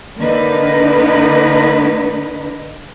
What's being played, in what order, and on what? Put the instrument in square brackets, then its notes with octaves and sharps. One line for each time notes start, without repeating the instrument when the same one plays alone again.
[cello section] D3 A#3 D4 D#4 B4